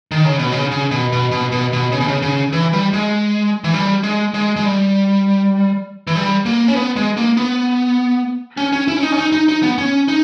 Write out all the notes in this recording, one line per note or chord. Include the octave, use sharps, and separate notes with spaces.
D#3
C#3
B2
C#3
C#3
B2
B2
B2
B2
B2
C#3
B2
C#3
C#3
E3
G3
G#3
E3
G3
G#3
G#3
G#3
G3
E3
G3
A#3
C#4
B3
G#3
A#3
B3
C#4
C#4
E4
C#4
D#4
C#4
D#4
D#4
D#4
B3
C#4
D#4